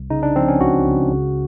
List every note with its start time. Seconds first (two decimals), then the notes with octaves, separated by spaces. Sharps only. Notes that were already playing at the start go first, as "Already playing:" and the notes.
Already playing: C2
0.10 C#3 D#4
0.23 D4
0.36 F3 C4
0.48 C#4
0.60 C#2 F#4
0.86 C#2
1.11 C#3